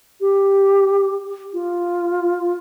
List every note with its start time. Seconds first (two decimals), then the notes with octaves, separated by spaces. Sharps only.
0.21 G4
1.53 F4